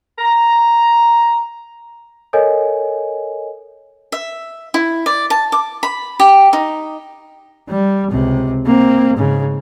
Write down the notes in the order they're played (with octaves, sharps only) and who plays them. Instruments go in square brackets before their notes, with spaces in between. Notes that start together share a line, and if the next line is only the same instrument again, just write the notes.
[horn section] A#5
[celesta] A4 A#4 C#5 D#5 G#5
[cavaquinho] E5
E4
D5
A5
D6
B5
G4
D#4
[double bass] G3
C#2 C3
A#3 C4
G#2 C#3